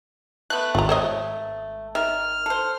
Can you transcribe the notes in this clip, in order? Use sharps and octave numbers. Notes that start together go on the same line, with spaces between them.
A3 B3 F#6
G#1 F4 A#5
C5 C#5 D#5
D#3 E5 F6
A4 C5